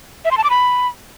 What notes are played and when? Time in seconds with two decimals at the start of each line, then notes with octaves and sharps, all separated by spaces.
0.25 E5
0.31 C6
0.38 A5
0.44 D6
0.50 B5